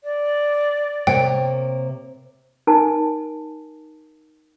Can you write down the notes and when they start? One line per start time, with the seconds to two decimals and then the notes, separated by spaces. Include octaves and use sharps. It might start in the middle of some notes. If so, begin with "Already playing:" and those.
0.04 D5
1.07 C3 A#3 C#5 G5
2.67 D#4 A#4 G#5 A5